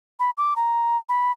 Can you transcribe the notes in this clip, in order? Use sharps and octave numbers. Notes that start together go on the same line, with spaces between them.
B5
D6
A#5
B5